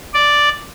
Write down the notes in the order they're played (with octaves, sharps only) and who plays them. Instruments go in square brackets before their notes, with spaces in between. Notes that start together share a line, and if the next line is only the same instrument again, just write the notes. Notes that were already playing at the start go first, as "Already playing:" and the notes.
[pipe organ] D5